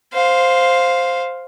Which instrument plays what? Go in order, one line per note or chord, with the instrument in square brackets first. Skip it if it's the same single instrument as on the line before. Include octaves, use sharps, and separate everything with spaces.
[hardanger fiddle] C5 F5